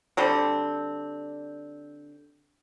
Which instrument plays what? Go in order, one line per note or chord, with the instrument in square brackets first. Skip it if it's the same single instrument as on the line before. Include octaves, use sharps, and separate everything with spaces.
[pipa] D3 G3 C4